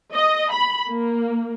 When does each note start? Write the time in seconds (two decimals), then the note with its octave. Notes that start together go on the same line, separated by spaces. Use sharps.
0.14 D#5
0.52 B5
0.89 A#3